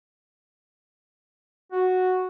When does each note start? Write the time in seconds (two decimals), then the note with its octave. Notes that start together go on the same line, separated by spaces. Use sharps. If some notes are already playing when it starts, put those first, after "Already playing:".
1.72 F#4